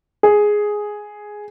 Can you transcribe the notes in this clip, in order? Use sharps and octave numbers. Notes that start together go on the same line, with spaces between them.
G#4